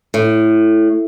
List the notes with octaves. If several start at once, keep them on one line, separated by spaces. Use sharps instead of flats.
A2